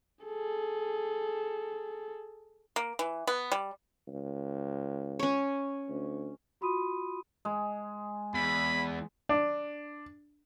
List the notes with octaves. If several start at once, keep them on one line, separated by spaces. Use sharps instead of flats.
G#4 A4
A#3
E3
B3
G3
C#2
C#4 C#5
D2
F4 F#4 B5 C6 D#6 D#7
G#3
E2 B5
D4